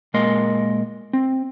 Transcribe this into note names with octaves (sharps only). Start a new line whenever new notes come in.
A#2 G#3 A#3 A#4 D#5 C6
C4